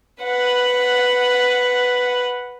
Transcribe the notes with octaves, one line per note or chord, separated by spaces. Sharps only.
B4 F#5